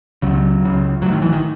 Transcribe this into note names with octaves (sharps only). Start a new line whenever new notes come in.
C#2 C#3 F#3
C#2 C#3
A1 A2 F#3
D#3
E3
D#3